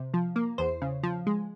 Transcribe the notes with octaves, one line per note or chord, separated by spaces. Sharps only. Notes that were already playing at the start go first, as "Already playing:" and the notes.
Already playing: C3
F3
A#3
E2 C5
C#3
F3
G#3